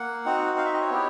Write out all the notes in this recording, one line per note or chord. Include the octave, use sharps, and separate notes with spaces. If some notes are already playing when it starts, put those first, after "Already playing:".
Already playing: A#3 F#5
C4 D#4 F#4
F5
E5
D#5
C#5
B3 E4 G4